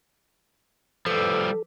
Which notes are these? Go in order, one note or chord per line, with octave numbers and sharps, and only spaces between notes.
F3 G3 A4 B4 D6 E6